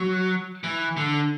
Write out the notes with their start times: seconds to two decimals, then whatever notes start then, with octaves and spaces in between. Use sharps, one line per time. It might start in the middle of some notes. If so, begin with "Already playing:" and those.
Already playing: F#3
0.64 E3
0.97 D3